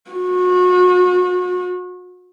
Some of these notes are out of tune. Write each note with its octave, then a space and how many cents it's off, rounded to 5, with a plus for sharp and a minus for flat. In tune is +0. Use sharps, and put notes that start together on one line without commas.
F#4 -35